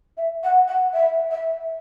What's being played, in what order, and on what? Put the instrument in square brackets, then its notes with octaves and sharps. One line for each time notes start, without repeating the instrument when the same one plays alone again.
[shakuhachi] E5
F#5
F#5
E5
E5